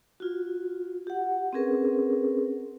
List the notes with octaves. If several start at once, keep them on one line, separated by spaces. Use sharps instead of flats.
F4 F#4
G4 F#5
C4 C#4 G#4 A#4 B4